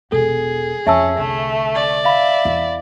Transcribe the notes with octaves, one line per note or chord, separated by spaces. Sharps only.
E1 B2 G#4 A4
F2 C#4 E5 A5 E6
C2 D3 A3
D5
E5 F5 B5
E2